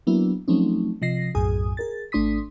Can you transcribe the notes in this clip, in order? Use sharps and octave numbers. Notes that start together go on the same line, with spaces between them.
F#3 A#3 B3 D4 E4
F3 F#3 A3 C4 C#4 D#4
C3 F3 D#5 A#6 C7
B1 F#2 A2 G#4 G#5 D#6
G#4 A#4 A6
G#1 A3 D4 C6 D#6 B6